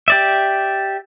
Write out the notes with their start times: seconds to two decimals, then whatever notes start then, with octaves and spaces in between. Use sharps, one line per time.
0.08 G4 D5 E5